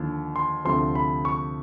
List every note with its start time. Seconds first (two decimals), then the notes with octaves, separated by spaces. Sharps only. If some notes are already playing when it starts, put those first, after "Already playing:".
Already playing: D#2 D3 F3
0.36 C6
0.65 D2 C3 F3 C6
0.95 B5
1.25 C#6